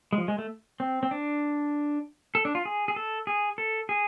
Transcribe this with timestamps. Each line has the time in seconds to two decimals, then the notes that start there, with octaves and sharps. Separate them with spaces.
0.13 G#3
0.18 F3
0.28 G#3
0.38 A3
0.80 C4
1.03 C4
1.11 D4
2.35 A4
2.45 D4
2.55 F4
2.65 G#4
2.88 G#4
2.96 A4
3.27 G#4
3.58 A4
3.89 G#4